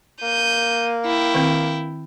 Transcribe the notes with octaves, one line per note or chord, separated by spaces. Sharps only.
A#3 G6 D#7
E4 G5
D#3 C4